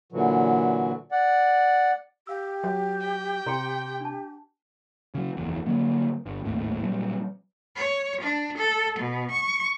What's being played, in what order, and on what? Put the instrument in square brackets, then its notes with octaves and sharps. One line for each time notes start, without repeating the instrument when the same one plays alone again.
[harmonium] A#2 D3 E3 F#3
D5 F#5
[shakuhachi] G4 [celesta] F5 E6
[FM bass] F#3 [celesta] G6
[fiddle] G5
[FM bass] C3 [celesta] A#5 C6 C#7
[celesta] D4 A5
[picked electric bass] C#3 F#3
F#1 E2
D3 F#3 A#3
G1
G#1 D#2 A2
A#2 F#3 G3
[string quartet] C#5
D4
A4
B2
C#6